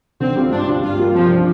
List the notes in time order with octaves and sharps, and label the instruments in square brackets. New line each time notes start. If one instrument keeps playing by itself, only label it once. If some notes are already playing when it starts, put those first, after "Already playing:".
[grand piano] D3 [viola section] C4
[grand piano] G3 C4 F4
[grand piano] G2 [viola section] D4
[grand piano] G3 D4 F4
[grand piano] G2 [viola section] F4
[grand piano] G3 A#3 F4
[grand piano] C3 [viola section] F3
[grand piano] F3 D4